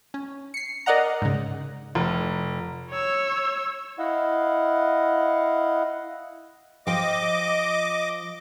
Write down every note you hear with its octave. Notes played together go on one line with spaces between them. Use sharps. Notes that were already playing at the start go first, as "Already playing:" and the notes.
C#4
C7 C#7
A#4 D5 D#5 F#5 A#5
G#2 C#3
F1
C#5 E6
E4 D#5 F5 F#5
F3 D#5 G5 D6